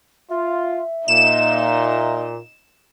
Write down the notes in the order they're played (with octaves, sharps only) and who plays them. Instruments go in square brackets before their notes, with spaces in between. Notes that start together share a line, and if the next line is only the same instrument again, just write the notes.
[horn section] F4 [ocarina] E5
[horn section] A#2 [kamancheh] D#4 D#5 [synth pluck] E7